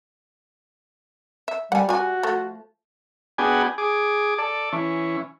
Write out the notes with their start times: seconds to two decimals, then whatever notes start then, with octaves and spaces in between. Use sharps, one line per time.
1.48 E5
1.72 G3 F#5 G#5
1.89 G3 F#4 G#5
2.23 F3 A3
3.38 B3 D4 F#4 G#4 G5 G#5
3.78 G#4 D6
4.38 A4 D5
4.72 E3 C#4